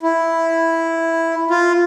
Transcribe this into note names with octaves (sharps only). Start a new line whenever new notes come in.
E4
F4